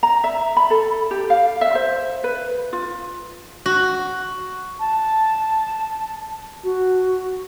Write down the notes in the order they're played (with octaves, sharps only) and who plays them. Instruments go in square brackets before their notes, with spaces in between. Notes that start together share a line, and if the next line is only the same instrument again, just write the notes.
[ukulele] A#5
E5
B5
A4
G4
F5
E5
C5
B4
F4
[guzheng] F#4
[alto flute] A5
F#4